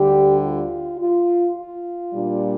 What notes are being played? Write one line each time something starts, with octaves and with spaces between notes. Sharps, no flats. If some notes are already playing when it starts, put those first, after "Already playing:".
Already playing: D2 D3 G3 G4
F4
F4
F4
A#2 G3 D4